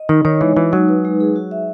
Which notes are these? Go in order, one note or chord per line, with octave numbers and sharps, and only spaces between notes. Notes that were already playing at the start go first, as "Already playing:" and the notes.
Already playing: D#5
D#3 D#4
D#3 C#5
E3 G#3
E3 F#4
F#3 D#4
B4
G#3
G#4
F#4
E5